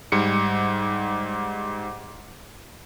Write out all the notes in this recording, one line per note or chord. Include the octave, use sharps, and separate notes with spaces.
G#2 G3 C#7